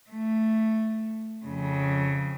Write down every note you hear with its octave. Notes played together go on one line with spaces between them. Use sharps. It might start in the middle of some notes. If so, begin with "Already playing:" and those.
A3
F2 C#3